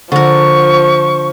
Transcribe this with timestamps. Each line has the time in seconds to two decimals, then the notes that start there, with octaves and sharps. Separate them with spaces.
0.12 D3 F3 A#4 C#6